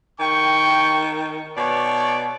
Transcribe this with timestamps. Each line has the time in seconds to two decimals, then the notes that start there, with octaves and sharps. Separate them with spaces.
0.19 D#3 G5 C#6
1.57 B2 C#5 D5